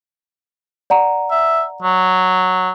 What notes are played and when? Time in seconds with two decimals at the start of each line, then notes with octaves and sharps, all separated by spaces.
0.90 D5 F#5 A#5
1.31 E5
1.82 F#3